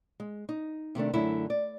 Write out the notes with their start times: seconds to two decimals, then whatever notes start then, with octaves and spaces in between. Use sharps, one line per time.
0.20 G#3
0.49 D#4
0.95 C3 D#3 A3 D4
1.14 F#2 D3 A3 D4 E4
1.50 D5